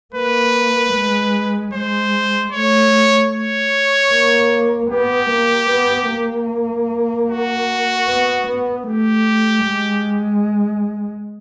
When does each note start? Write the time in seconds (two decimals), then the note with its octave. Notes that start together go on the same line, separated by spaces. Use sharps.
0.14 A#3 B4
0.93 G#3
1.73 G#3 C5
2.52 A3 C#5
3.31 C#5
4.11 A#3
4.90 B3 G4
5.30 A#3
5.69 B3
6.09 A#3
7.29 F#4
8.08 B3
8.47 B3
8.87 A3 G4
9.67 G#3